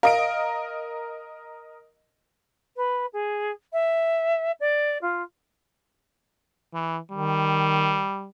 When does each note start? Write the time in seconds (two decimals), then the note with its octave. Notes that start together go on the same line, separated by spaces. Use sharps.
0.03 A#4 D#5 F5 D7
2.76 B4
3.13 G#4
3.73 E5
4.60 D5
5.01 F4
6.74 E3
7.12 D#3 G3